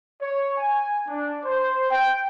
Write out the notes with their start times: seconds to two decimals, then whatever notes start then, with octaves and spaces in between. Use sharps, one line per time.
0.22 C#5
0.58 G#5
1.08 D4
1.44 C5
1.90 G5